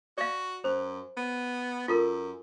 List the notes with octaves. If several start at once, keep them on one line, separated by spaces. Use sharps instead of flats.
F#4 D5 F5
F#2 C5
B3
F#2 F4 A4 A#4